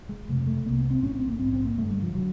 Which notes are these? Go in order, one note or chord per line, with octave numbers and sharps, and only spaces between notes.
G#3
F#1 F2 C3 A3
A3
C2 C3 A#3
B3
C4
A#1 A2 C#4
C4
A#3
A#1 G#2 C4
C4
A#3
G1 G2 D3 A3
G3
F3
D3 F#3